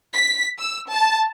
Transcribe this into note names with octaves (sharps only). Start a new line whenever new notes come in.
B6
E6
A5